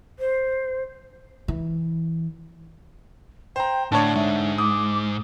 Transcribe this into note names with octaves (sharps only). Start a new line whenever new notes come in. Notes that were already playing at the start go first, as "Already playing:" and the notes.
C5
E3
C5 G5 A#5
A2 D3 D4 C#5 A5
G#2 E5
D6 D#6